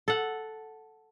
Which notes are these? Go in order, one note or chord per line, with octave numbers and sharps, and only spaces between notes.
A4 F#5